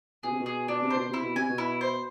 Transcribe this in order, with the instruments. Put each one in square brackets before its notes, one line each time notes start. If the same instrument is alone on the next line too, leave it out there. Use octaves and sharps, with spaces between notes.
[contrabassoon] B2 [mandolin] G#4
[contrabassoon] C3
B2
[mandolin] G#4
[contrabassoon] B2 [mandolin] D4
[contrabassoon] C3
[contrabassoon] B2 [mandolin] C5
[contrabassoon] C3 [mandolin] E4
[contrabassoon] B2
[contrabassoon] C3 [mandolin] G#5
[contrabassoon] B2
[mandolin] E4
C5